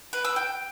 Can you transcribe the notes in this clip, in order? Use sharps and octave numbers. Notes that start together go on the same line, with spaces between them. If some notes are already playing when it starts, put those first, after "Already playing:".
B4
E6
G5